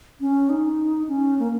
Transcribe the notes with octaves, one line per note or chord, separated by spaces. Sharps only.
C#4
D#4
C#4
A#3